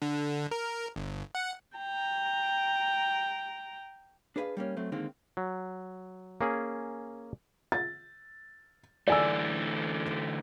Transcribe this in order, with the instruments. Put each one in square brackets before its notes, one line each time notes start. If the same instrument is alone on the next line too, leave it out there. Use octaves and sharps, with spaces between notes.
[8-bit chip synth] D3
A#4
G1
F#5
[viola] G5 A#5
[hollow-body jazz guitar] D4 G#4 B4 E5 F5
G3 A#3 C#4
F#3 A3 C4
D3 D#3 G#3 A#3 C4
[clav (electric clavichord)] F#3
A#3 C#4 G#4
[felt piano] A6
[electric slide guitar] D3 E3 A3 [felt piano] D5 G#5 E6